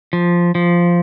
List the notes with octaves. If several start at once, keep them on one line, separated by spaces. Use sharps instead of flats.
F3
F3